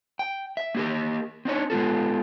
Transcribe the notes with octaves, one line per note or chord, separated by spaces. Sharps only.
G5
E5
A#3 G4 A#4
C4 D4 D#4 C#5
G#3 B3 F4 A4